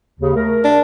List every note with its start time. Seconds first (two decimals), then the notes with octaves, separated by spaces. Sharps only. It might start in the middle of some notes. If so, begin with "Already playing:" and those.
0.20 D#2 C#3
0.35 A3 A#4
0.65 D4